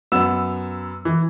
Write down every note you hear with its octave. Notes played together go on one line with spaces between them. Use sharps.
F#2 B3 E6 E7
E3